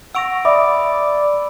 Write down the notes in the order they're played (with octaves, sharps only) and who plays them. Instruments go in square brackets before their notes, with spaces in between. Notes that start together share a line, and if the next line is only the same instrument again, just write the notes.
[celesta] F#5 C#6 A#6 [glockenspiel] E6 D7 F7
[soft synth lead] D5 [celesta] E5 D6 D#6 [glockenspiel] B5